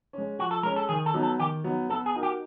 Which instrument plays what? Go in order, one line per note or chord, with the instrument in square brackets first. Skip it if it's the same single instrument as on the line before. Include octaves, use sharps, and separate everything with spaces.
[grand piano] G#3 C#4
[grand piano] F3 [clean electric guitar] F#4
[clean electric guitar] A4
[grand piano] G#3 C#4 [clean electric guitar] A#4
[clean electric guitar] A4
[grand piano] D#3 [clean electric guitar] G#4
[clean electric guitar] A4
[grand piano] F#3 B3 D#4
[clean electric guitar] A4
[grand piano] D#3 [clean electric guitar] G4
[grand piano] F#3 B3 D#4
[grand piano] B3 [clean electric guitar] A4
[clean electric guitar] G#4
[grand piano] D#4 F#4 A#4
[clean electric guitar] G4